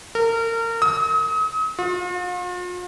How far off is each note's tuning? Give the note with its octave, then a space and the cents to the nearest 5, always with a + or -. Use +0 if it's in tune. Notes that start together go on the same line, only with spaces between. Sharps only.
A#4 -30
D#6 +40
F4 +45